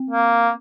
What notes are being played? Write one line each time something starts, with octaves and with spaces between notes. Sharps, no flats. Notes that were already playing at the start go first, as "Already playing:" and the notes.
Already playing: C4
A#3